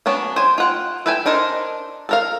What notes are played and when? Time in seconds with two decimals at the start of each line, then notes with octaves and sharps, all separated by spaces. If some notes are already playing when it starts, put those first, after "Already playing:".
0.06 F#3 B3 C#4 D4
0.36 C5 G#5
0.58 F4 F#5 G5
1.06 A4 B4 E5 G5 G#5
1.26 D4 D#4 A#4 C5
2.09 A4 A#4 F5